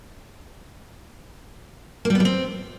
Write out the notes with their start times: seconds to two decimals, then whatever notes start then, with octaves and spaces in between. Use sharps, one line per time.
2.05 A#3
2.10 G3
2.15 B3
2.20 G3
2.25 C4